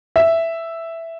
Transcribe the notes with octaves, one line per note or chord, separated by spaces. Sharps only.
E5